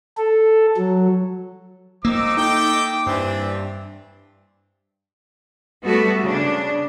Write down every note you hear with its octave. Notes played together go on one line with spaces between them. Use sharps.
A4
F#3
D#3 F3 A#3 D#4 D6 E6
A3 D#4 A4 G5
G2 E3 C4 D4
G3 A3 B3 F#4 A4
C#3 D4